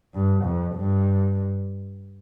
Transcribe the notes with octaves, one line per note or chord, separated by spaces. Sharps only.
G2
F2
G2